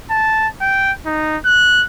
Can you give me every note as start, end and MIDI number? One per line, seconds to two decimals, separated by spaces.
0.10 0.48 81
0.61 0.92 79
1.06 1.37 63
1.46 1.85 90